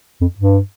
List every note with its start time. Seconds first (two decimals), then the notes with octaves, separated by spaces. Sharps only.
0.21 F2
0.38 G2